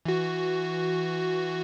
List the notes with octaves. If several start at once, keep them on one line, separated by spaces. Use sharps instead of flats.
E3 F#4